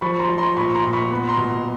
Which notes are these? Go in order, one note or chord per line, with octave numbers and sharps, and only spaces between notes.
F3 B5 C#6
A#5 C6
F3
A#5 C6
A#2 B5 C#6
A#5 C6
A#2
B5 C#6
B3
A#5 C6
B2